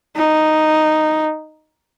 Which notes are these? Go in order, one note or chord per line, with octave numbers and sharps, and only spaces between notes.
D#4